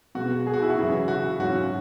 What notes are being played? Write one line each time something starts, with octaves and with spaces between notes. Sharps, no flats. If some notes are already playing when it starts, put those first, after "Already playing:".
B2 G#3 B3 F#4
G#4
F#4
E4
F#4
F#2 C#3 E3 E4
F#4
G#2 F#3 C#4 E4 F#4